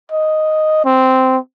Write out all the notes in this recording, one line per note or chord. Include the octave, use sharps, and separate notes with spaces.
D#5
C4